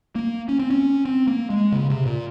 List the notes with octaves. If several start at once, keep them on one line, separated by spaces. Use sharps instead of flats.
A#3
C#4
C4
C#4
C4
A#3
G#3
C#3
C3
A#2